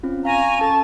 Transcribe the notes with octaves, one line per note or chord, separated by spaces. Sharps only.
C4 C#4 F4
F5 G#5 A#5 C#6 A#6
C#4 A4 A5 C#6